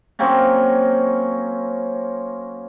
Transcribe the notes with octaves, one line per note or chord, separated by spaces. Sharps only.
F#3 A#3 C4 C#4